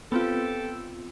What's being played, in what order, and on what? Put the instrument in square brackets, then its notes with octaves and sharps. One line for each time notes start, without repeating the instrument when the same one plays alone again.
[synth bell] B3 C4 F4 [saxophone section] G4 A4